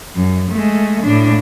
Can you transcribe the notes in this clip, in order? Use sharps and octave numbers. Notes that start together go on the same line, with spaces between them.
F#2
G#3 A3
A2 D4